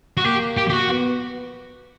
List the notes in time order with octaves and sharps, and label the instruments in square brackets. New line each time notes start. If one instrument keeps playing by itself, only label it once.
[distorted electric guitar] F#4
[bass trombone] A#3 [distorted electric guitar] G4
[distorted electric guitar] G4
G4
F#4
[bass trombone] B3